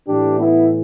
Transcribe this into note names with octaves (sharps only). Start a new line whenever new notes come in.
A2 E3 D4 G4
B3 E4